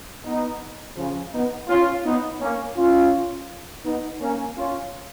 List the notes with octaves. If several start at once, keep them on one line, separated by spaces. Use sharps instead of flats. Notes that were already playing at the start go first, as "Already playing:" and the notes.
B3 D#4
C#3 F3
B3 D#4
C#4 F4
B3 D#4
A#3 C#4
C#4 F4
B3 D#4
A#3 C#4
C#4 F4